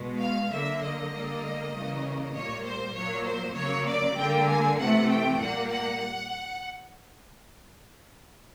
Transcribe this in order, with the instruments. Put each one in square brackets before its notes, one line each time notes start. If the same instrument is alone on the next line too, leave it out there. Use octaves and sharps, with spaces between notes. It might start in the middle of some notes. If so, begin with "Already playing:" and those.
Already playing: [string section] B2 G#3
F5
D3 F#3 A#3 E5
D#5
D3 G3 A#3
C#3 E3 G3 A#3
A#2 G3 A#3 C#5
C5
A#2 F#3 A#3 C#5
C5
C#3 F#3 A#3 C#5
D5
D3 G3 A#3 G5
G#5
C3 E3 A3 F#5
G5
A#2 G3 A#3 F#5
F#5